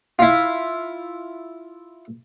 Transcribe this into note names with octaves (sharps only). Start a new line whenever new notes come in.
E4 F4